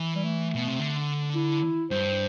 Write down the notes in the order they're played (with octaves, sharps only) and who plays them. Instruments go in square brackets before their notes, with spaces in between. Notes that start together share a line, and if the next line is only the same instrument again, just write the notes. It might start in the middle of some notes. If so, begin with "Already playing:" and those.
Already playing: [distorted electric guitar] E3
[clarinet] G3
A3
[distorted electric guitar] B2
C3
D3
[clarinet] E4
[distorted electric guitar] G2 [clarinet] C5